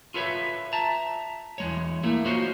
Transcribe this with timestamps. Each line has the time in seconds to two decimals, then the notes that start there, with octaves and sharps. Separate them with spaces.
0.14 F4 A4 B4 C#5 E5
0.73 E5 A5 A#5
1.58 E2 G#3 C#5
2.03 A3 A#3 E4
2.25 D#4 F4 F#4 C5 C#5